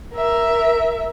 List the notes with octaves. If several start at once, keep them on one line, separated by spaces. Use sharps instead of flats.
A#4 E5